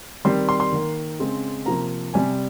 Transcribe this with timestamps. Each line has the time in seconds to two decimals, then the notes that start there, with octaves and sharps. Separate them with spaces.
0.25 D#3 G3 C4 C6
0.49 C6
0.60 C6
0.72 D#3 A#3
1.19 C#3 G#3 C4
1.66 C3 F3 A#3 A#5
2.14 C3 G3 C4 G#5